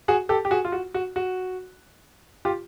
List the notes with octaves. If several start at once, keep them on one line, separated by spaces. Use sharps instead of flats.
F#4 G#4
G4 A4
G4
F#4 G#4
F4
F#4
F#4
F#4
F4 G4